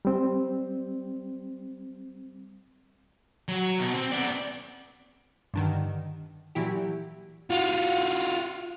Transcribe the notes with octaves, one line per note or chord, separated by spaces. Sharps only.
G3 C4
F#3
B2
C4
B3 D5
G2 D3 D#3
A#2 E3 F#3 E4 G4
F4 F#4